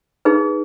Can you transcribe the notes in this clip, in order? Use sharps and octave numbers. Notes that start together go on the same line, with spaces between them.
D#4 G#4 B4